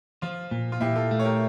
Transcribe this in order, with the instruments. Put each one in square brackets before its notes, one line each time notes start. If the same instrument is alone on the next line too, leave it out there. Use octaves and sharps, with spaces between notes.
[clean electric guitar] F3 [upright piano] F4
[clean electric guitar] A#2
[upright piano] F4
[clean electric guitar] A#2 [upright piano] E4 G4
[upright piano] F4 A4
[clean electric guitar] A3
[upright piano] C#5
G4 A#4